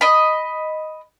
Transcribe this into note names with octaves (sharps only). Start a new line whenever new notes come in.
D#5 B5